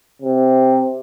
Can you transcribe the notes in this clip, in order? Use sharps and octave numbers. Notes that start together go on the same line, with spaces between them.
C3